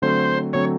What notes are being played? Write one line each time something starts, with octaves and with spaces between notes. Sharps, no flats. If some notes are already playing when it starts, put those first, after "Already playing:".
D3 F#3 A3 C4 C5
D3 F#3 A3 C4 C#5